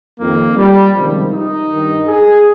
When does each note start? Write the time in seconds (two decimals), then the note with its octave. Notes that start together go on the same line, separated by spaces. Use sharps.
0.19 F2 D#3 A#3
0.57 G3
0.94 C#2 C3 D#3 F3
1.33 D#4
1.70 G2 D#3
2.08 G#4